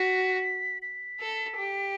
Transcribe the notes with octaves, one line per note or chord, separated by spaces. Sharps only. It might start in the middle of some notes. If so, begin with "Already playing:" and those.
Already playing: F#4 B6
B6
A4
G4